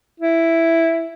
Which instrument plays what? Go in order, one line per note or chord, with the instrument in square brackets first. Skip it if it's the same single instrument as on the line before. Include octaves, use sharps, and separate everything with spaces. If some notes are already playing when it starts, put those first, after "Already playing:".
[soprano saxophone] E4